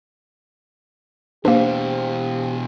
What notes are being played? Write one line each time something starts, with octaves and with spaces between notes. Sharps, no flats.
B2 E3 A#3 D4 G4 C5